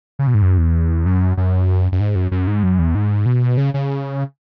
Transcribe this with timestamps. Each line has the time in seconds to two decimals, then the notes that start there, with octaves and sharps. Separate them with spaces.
0.19 C#3
0.27 B2
0.34 G#2
0.42 F#2
0.58 E2
1.06 F#2
1.37 F#2
1.92 F#2
2.00 G#2
2.15 F#2
2.31 F#2
2.47 G#2
2.63 F#2
2.79 E2
2.95 G#2
3.26 B2
3.57 C#3
3.74 C#3